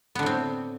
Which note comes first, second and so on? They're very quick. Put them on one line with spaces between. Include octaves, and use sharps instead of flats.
B3 D3 A2 C4